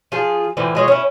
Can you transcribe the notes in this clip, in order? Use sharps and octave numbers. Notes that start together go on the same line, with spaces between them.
F3 F4 G#4
A2 D3 E3 F3
F3 G#3 C#5
C#4 E4